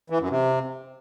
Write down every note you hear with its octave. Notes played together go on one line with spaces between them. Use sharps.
E3
F#2
C3